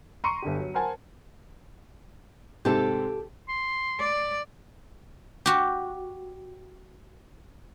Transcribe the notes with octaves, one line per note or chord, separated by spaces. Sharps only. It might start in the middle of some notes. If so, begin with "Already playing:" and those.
A#5 C6 C#6 C#7 D#7
G1 D3 G4
F#3
A#4 C5 F#5 G#5 A5
G#2 C3 C4 G4 A4
C6
D5
F#4 G4